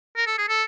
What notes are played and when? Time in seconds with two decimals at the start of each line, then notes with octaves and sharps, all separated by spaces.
0.17 A#4
0.27 A4
0.38 G#4
0.48 A4